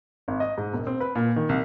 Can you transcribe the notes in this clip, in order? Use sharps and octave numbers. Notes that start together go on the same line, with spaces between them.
G#1
D#5
G#2
E1
C4
B4
A#2
D#3
C2